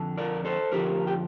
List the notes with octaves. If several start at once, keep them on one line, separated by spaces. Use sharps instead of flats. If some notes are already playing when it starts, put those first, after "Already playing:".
Already playing: F2 D3 F3
A#4 D5
A4 C5
F2 D3 F3 G4 A#4
G4